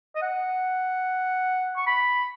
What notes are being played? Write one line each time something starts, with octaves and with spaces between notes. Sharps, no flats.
D#5
F#5
C#6
B5